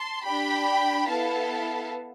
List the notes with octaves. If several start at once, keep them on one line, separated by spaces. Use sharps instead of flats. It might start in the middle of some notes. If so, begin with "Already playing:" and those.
Already playing: A5 C6
D4 G4 G5 B5
B3 E4 A4 F5 A5